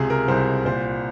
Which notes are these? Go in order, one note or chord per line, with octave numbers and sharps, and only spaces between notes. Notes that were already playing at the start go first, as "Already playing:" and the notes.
Already playing: C#2 C3 G#4
A#4
C2 C5
A#2 C5